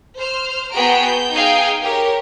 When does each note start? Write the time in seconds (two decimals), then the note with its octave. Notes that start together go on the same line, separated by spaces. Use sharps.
0.18 C5 F6
0.73 B3 F#4 G#4 G5 A#5 D7
1.03 G6
1.33 D#4 G#4 F5 G5
1.81 G4 A#4 C#5